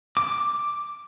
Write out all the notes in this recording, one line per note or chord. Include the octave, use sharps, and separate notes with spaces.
D6